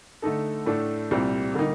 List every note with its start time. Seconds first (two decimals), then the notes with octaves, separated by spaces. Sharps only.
0.22 D3 A3 D#4 A4
0.66 A2 A3 D4 A4
1.11 C2 A#2 G3 C4
1.54 D3 G3 A#3 D#4